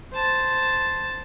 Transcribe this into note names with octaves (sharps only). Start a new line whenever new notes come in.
C5 A5